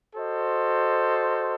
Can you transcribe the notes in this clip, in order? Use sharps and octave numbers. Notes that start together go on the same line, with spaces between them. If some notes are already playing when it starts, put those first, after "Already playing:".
F#4 A4 C5 D#5